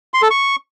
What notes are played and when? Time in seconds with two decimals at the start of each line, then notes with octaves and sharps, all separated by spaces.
0.14 C6
0.22 A4
0.30 C#6